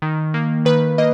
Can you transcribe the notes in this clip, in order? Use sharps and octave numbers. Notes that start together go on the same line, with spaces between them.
D#3
A#3
D#3 B4
A#3 D#5